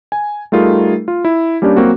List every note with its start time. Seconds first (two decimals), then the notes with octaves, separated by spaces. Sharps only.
0.12 G#5
0.52 G3 A3 D#4 F4 G#4 A#4
1.08 F4
1.25 E4
1.62 G3 A#3 C#4 D4 G4 D5
1.77 F#3 A#3 C4 F#4